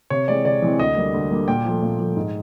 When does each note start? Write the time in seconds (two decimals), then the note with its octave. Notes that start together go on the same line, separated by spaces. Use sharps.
0.10 C3 C#5
0.28 E3 G#3 C4 D5
0.45 C3 D5
0.62 E3 G#3 C4
0.79 D2 D#5
0.97 D3 G3 A#3
1.14 D2
1.31 D3 G3 A#3
1.48 A#2 G5
1.65 F3 A3
1.82 A#2
1.99 F3 A3
2.17 G#2